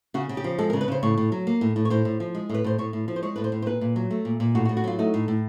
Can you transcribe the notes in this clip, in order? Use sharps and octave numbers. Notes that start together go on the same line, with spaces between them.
C#3 F#4
C#3
G4
F3
G#3 A4
A#4
C#3
B4
C#3 C5
A2 C#5
A2
F#3
A#3
A2
A2
C#5
A2 C5
A2
F3
G#3
A2 B4
A2 C5
A2 C#5
A2
F3
C5
G#3 C#5
A2 B4
C5
A2
C5
A#2 B4
A#2
F#3
A3
A#2
A#2
A2 F#4
F#4
A2
F#4
F#3 F4
A3 D#4
A2
A2